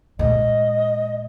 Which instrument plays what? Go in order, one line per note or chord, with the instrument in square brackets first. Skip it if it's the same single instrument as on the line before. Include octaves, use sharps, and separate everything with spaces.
[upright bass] A#2 G#3 [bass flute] D#5